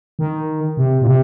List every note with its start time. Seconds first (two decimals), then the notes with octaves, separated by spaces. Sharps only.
0.19 D#3
0.77 C3
1.02 A#2
1.07 C3